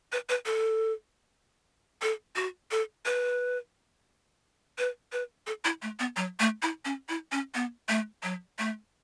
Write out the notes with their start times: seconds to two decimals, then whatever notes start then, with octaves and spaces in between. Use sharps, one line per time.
0.12 B4
0.29 B4
0.46 A4
2.02 A4
2.36 F#4
2.71 A4
3.06 B4
4.78 B4
5.12 B4
5.47 A4
5.64 E4
5.82 A3
5.99 B3
6.16 F#3
6.40 A3
6.62 E4
6.85 C#4
7.09 E4
7.32 C#4
7.55 B3
7.89 A3
8.23 F#3
8.59 A3